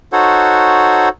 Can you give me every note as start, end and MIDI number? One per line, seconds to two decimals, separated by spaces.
0.13 1.09 63
0.13 1.09 66
0.13 1.09 69
0.13 1.09 72
0.13 1.09 73
0.13 1.09 78